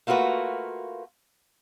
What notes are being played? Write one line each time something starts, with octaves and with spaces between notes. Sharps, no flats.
A3 A#3 F4 F#4 B4